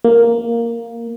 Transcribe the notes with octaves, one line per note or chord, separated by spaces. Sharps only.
A#3